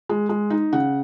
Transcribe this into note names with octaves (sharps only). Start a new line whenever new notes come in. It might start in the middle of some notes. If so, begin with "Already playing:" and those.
G#3
G#3
D#4
C#3 F#5